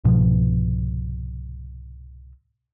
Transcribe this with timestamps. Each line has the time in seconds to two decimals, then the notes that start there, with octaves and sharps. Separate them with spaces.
0.04 C2 G#2 B2 F3